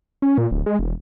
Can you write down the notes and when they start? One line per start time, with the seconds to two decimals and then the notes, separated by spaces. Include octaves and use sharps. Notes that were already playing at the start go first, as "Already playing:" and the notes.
0.22 C#4
0.38 A#2
0.51 D1
0.66 G#3
0.79 E1